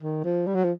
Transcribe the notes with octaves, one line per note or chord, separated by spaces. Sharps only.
D#3
F3
G3
F#3
F3